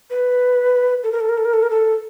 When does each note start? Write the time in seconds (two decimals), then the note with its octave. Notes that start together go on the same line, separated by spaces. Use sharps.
0.10 B4
1.03 A4
1.12 A#4
1.20 A4
1.29 A#4
1.37 A4
1.45 A#4
1.53 A4
1.62 A#4
1.70 A4